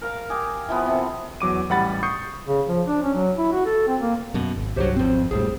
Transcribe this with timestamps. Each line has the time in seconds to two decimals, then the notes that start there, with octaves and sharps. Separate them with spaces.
0.01 A#4 F5 A#5
0.30 G4 G#4
0.69 E3 F3 B3
0.86 C3 A4
1.40 E2 F#3 D6 D#7
1.69 A1 G3 F#5 B5 A6
2.03 C#6 D#6 G6 C7 C#7
2.47 C#3
2.67 F3
2.87 D4
3.03 C#4
3.15 F#3
3.38 E4
3.52 F#4
3.66 A4
3.87 C4
4.01 A#3
4.34 F#2 B2
4.56 G#1
4.76 C2 G2 F#3 G4 C5 C#5
4.97 G#1 F2 C4 C5
5.31 A#1 A2 G3 G#4 C5